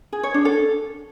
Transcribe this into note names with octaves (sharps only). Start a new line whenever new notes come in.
G#4
C#5
D4
A4